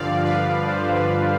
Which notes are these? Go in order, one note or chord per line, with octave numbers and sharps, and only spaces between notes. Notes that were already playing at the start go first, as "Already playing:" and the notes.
Already playing: G2 D3 F3 D5 F5
B4 D5
C5
B4